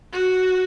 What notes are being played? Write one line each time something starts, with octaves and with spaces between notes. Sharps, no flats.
F#4